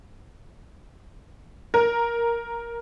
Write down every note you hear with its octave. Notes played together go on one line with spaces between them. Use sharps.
A#4